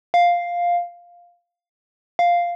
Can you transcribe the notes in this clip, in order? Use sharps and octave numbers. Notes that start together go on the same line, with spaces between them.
F5
F5